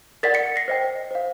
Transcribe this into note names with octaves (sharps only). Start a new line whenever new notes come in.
A#4 D5 F#5 A6 B6
B6 C#7
A#6 C7
C5 D#5 G5
C5 F5